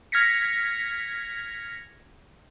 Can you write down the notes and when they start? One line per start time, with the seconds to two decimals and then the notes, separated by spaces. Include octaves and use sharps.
0.12 F6 G#6 A#6 B6 C#7